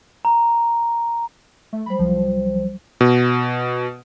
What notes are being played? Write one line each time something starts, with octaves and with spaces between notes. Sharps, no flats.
A#5
A3
F#3 G3 C5 B5
C2 F3
B2